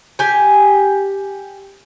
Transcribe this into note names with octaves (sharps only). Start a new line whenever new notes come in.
G4 G#5